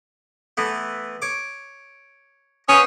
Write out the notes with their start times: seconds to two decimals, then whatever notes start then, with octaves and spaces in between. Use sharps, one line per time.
0.57 E3 A3 B3
1.22 C#5 D6
2.69 B3 C#4 C5 D#6